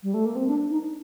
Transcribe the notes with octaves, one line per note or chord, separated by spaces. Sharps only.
G3
A3
A#3
C4
D4
D#4